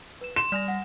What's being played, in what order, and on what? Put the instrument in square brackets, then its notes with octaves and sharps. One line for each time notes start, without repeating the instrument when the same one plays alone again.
[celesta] B4 E7
[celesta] C6 [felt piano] E7
[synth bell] G3 G#5 A#6 [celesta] D5 F7
[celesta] F#5